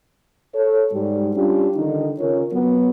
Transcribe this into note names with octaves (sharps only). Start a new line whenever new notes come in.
A4 C#5
G#2 G3
G3 C#4 D4 F4 G4
D3 D#3 D#4
C#3 C#4 F4 A#4 C#5
F#3 B3